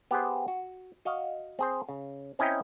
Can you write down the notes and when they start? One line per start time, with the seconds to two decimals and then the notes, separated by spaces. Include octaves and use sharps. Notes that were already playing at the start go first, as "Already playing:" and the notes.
0.11 B3 G4 G#4 C5
0.48 F#4
1.05 F#4 D#5 F5
1.59 C4 G#4 C5
1.89 C#3
2.39 C4 C#4 E4 D#5 G5 A#5